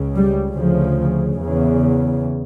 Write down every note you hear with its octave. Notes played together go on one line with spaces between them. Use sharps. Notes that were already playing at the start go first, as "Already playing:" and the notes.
Already playing: C#2 C#3
G3
D2 C#3 F3
E2 C#3